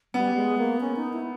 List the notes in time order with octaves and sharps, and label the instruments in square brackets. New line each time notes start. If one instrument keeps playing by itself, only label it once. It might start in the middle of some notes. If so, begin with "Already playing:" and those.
[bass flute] G3 [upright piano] B3
[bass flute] G#3
A#3
C#4
D#4
E4